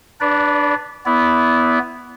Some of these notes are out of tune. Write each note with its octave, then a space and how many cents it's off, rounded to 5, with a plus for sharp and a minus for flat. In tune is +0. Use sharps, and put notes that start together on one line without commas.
D4 +10 B4 -10 D5 -30
B3 +0 E4 +0 D5 -30